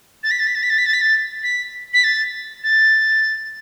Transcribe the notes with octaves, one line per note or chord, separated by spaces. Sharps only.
A6
B6
A6
B6
A6
B6
A6
B6
A6
B6
A6
B6
B6
A6
A6